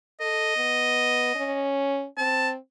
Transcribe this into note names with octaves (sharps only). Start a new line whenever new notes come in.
A4 D#5
B3
C#4
C4 A5